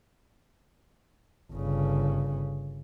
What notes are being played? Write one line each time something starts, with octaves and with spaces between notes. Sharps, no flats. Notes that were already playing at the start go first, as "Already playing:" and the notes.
G1 C#3